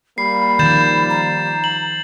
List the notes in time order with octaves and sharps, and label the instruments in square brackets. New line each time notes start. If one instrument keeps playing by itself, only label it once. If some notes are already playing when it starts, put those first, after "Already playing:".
[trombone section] G3 A#3 [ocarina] B5 [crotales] C7
[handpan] D#3 F3 [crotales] G6 A6 E7
[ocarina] A#5
[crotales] F#7